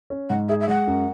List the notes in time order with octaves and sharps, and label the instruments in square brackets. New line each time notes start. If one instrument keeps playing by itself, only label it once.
[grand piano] C#4
[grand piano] G#2 [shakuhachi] F#5
[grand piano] G#4 [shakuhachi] E5
[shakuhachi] E5
[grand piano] G#3 [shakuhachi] F#5
[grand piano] F#2